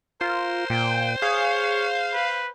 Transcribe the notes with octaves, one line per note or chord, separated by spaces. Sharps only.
F4 A#4 C5
A#2 G5
G#4 C#5 F5
B4